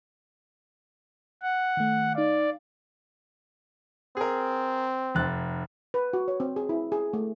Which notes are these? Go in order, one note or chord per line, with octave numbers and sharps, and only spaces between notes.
F#5
D#3 A3
D#4 D5 F5
C4 G#4 A#4
F1 F#6 A6
B4
F#4
C#5
C4
G#4
E4
G#4
A3